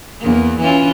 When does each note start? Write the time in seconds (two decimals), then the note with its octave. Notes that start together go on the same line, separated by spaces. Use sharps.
0.19 E2 A#3
0.60 E3 C#4 F4